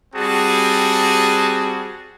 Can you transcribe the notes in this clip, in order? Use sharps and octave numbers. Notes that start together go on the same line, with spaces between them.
G3 C4 F#4 G#4 A5